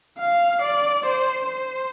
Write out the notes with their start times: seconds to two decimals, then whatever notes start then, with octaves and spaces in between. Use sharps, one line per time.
0.19 F5
0.62 D5
1.06 C5
1.49 C5